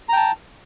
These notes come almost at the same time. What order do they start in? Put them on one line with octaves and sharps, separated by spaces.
A#5 G5 A5